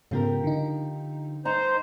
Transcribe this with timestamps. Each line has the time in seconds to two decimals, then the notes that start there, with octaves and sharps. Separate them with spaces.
0.11 G#2 C#3 F3 B3 G4 A#4
0.44 D3 D#4
1.45 G2 D#4 C5 A#5